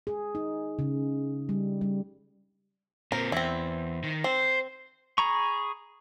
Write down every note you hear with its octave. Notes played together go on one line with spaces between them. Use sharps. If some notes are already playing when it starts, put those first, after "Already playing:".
G#4
D#4
C#3
G3
G3
A#2 C4 A#4
E2 C4 E4
D#3
C4 C5
G#4 A#5 B5 C#6